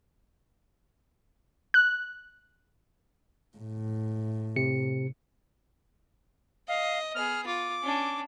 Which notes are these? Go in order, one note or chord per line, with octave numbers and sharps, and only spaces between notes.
F#6
A2
C3 C#7
D#5 F5
B3 G#4 F6
F4 D6
C#4 D4